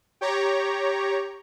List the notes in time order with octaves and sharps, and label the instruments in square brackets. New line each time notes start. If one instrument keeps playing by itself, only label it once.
[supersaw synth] G4 C#5 A#5